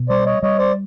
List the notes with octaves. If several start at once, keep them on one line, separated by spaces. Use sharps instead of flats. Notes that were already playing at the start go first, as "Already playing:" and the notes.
Already playing: B2
G3 C5 D5
C#5 D#5
G3 C#5 D#5
C5 D5